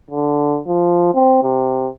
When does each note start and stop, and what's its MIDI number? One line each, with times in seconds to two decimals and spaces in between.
0.11 0.59 50
0.67 1.10 53
1.14 1.39 60
1.43 1.88 48